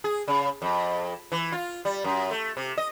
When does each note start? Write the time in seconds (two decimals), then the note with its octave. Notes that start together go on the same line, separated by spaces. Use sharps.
0.04 G#4
0.28 C#3
0.62 F2
1.32 E3
1.52 F4
1.85 G3
2.04 F#2
2.31 A3
2.57 C3
2.78 D#5